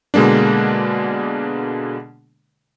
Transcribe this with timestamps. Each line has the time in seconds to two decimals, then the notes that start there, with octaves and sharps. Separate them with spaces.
0.14 B2 D3 G#3 A#3 D4